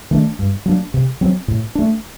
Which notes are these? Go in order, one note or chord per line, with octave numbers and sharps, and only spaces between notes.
D#3 A3 D4
G2
F#3 A#3 D4
C3
F#3 C4
A2
A3 D4